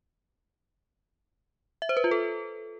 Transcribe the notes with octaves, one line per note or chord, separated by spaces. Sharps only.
E5
C5
B4
F4
A4